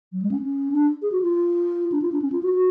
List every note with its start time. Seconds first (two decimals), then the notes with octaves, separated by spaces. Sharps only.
0.13 F#3
0.22 G#3
0.31 C#4
0.42 C#4
0.72 D4
1.02 G#4
1.12 F#4
1.22 F4
1.92 D4
2.02 F4
2.12 D4
2.22 C#4
2.32 F4
2.43 F#4
2.53 F#4